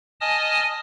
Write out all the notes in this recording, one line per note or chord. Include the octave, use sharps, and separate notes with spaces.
D#5 G#5 A5 D#6 F6